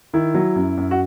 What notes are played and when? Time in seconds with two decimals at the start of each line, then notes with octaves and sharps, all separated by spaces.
0.13 D#3 E4
0.34 F#3
0.56 F#2
0.77 F#2
0.91 F#4